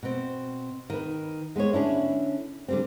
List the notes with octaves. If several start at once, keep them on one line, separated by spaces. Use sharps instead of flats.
B2 C4
D#3 B4
G#3 B3 B4 C#5
D3 C#4 D4 E4
D3 G3 C4